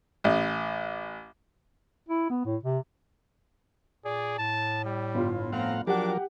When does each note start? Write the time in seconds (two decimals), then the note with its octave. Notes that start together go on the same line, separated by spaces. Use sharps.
0.24 A1
2.08 E4
2.30 B3
2.45 A2
2.63 C3
4.05 A#2 G#4 D5
4.38 A2 A5
4.85 G3
5.15 G1 F4
5.52 A2 F3 C4 F5 F#5 A#5
5.87 F3 F#3 D4 G4 A#4 F#5 D6